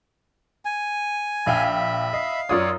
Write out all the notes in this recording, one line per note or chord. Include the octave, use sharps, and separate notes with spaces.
G#5
A#1 E5 F5 G5 B5
D#5 F5
F#2 F4 C#5 D5 D#6